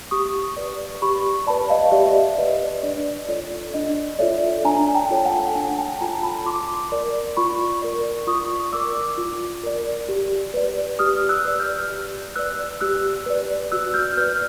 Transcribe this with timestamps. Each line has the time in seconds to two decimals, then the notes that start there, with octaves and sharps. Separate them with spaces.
0.11 G4 C#6 D#6
0.56 B4 D5
1.02 G4 B5 C#6
1.47 B4 D5 A5 B5
1.70 D#5 F5
1.92 G4 D5 E5
2.38 B4 D5 D#5
2.83 D4 D5
3.29 F4 A4 C#5 D5
3.74 D4 D#5
4.19 F4 A4 C#5 D5 E5
4.65 D4 G#5 A#5
4.94 G5 A5
5.10 F4 A4 C#5
5.25 F#5 G#5
5.55 D4 F#5 G#5
5.78 G5 A5
6.01 F4 A4 C#5 G#5 A#5
6.23 A5 B5
6.46 F4 C6 D6
6.92 A#4 D5
7.37 F4 B5 C#6
7.82 A#4 D5
8.27 F4 C#6 D#6
8.72 A#4 D5 D6 E6
9.18 F4
9.63 A#4 D5
10.09 G4
10.54 B4 D5
10.99 G4 D#6 F6
11.29 E6 F#6
11.45 B4 D5
11.60 F6 G6
11.90 G4
12.36 B4 D5 E6 F#6
12.80 G4 E6 F#6
13.26 B4 D5
13.72 F#4 E6 F#6
13.94 F6 G6
14.17 B4 D5 F6 G6